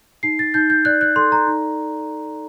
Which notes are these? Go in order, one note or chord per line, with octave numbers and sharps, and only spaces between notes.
D#4 C7
A6
D#4 G6
G6
D5 F#6
F#6
A4 C6
A#5
D#4